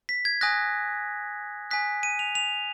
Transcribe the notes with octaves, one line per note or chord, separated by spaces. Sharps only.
B6
G#6
G#5 D#6 F#6 A#6
G#5 D#6 F#6 B6
D#7
F7
F7